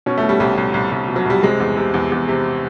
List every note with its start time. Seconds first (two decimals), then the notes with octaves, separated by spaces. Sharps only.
0.06 B2 C#4
0.17 A3
0.23 B2
0.29 G3
0.40 C2 G3
0.58 C2
0.74 C2
0.92 C2
1.08 B2
1.16 F#3
1.26 C2 G3
1.43 C3 G#3
1.60 E2
1.77 C3
1.94 E2
2.12 E2
2.28 C3